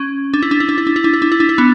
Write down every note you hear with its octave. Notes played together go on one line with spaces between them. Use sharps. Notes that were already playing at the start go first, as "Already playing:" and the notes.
Already playing: C#4
D4
E4
D4
E4
D4
E4
D4
E4
D4
E4
D4
E4
D4
E4
B3 D4